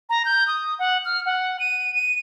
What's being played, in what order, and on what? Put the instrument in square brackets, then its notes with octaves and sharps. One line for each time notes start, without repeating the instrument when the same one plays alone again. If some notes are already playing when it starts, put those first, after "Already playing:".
[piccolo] A#5
G6
D#6
F#5
F6
F#5
D#7
D#7